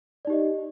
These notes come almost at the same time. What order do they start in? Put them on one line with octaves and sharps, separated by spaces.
D5 D#4 G4 D#5